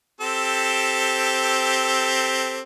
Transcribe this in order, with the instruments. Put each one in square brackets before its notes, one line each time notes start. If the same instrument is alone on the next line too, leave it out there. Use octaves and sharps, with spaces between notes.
[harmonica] C4 G4 A4